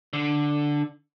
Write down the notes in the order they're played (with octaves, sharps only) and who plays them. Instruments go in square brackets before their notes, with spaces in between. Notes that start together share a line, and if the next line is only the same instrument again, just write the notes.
[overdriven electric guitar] D3